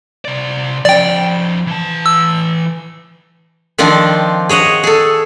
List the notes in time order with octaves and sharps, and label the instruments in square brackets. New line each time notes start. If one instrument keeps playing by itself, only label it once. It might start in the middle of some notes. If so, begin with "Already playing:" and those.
[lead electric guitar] C3 D5
[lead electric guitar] F3 C#4 [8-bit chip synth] D5 G5
[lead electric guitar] E3 A5
[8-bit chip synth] E6
[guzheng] D#3 F3 C4 D4
G#4 C#5 D#5 F#5
G#4 A4